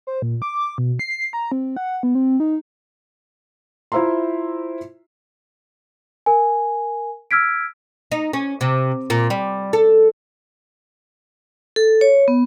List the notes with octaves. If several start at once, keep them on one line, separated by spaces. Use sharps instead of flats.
C5
A#2
D6
B2
C7
A#5
C4
F#5
B3
C4
D#4
E4 F4 C5 E5 A#5 C6
A#4 G#5
E6 F6 G#6 B6 D7
D#4
C#4
C3
A#2
G3
A4
A4
C#5
B3